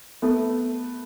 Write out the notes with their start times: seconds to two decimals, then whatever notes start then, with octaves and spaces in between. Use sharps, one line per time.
0.22 A3 B3